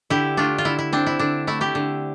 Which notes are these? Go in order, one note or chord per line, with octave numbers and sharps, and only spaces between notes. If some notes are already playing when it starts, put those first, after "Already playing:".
D3 E4 G4
A3 D4 F4
F4
D3 E4
E4
C4 D4
E4
D3 D4
A3 E4
E4 G4
D3